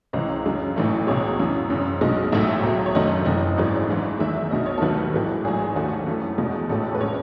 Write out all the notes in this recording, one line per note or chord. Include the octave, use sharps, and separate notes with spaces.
C#2 C#3 E3 D#5
F#2 C#3 G#3
A1 G#2 E3 A3
C#2 B2 G#3 C#5
F#2 C#3 E3
F#1 F#2 C#3
B1 B2 G#3 D#5
A1 G#2 F#3 A3 E5
C#2 B2 F#3
C#5
F#1 F#2 D#3 A3 D#5
F#1 F#2 E3 D#5
G#1 F#2 E3 G#3
G#1 G#2 E3
E2 D#3 G#3 E5
B1 B2 F#3 D#5
C#5
A4
D#2 D#3 F#3 A3 B4
A1 G#2 E3 G#3
G#1 G#2 F#3 A3 G#4
D#2 D#3 F#3 A3 F#4
F#2 E3 A3
E2 B2 G#3
A1 A2 G#3 A4
B4
C#3 G#3 C#5